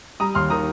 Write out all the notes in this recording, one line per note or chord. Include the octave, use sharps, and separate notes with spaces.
G3 A#5 D#6
D#2 C6 F6
D#3 A#5 D#6